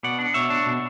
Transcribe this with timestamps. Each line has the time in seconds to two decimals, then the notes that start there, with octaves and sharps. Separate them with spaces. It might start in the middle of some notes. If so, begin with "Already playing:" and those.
0.03 B2 D5 F#5
0.19 D4
0.34 B2 C#5 E5
0.50 D4
0.66 B2